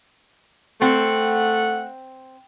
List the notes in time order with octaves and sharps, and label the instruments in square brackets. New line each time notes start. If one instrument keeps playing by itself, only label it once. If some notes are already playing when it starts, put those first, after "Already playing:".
[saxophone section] A3 F#5 [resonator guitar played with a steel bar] C4